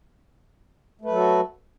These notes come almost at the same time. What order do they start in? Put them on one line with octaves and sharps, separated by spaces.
A3 B4 F#3 A4 F#4